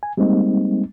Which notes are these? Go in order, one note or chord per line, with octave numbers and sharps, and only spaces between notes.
G#5
G3 G#3 A#3 C4 D#4